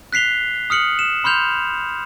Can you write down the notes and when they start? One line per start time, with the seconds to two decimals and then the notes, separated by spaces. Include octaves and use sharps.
0.13 F#6 B6 C7 F7 G7
0.70 D#6 F6 C#7 F#7
0.99 E7
1.24 B5 C6 F6 G6 F7